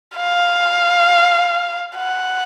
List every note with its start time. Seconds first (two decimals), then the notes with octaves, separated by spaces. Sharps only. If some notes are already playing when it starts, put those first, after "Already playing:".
0.16 F5
1.96 F#5